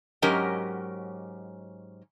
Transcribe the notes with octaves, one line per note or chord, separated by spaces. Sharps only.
G#2 F#3 C#4 G4 A#4 D#5